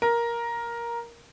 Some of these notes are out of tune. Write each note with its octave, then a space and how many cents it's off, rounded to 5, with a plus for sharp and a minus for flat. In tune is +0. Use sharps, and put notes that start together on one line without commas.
A#4 +10